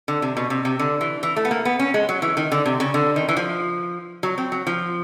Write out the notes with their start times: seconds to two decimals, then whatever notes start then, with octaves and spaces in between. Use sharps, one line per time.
0.08 D3
0.22 C3
0.37 B2
0.50 C3
0.65 C3
0.79 D3
1.01 E3
1.23 E3
1.36 A3
1.45 B3
1.51 A#3
1.65 B3
1.79 C#4
1.94 G#3
2.09 F#3
2.22 E3
2.37 D#3
2.52 D3
2.66 C3
2.80 C#3
2.94 D3
3.16 D#3
3.29 E3
3.37 F3
4.23 F#3
4.38 C4
4.52 F#3
4.67 F3